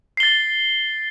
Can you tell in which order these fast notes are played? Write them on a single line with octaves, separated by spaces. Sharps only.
C7 G7 A6